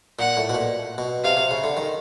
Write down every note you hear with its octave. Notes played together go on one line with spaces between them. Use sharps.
A#2 F#5
A2
B2
A#2
B2
C3 F5
C3
C#3
D3
D#3